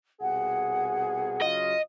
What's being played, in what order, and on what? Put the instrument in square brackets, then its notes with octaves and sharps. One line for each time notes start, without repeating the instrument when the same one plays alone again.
[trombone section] C2 B2 G#4 [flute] F#5
[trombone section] C#3 F#3 F4 [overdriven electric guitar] D#5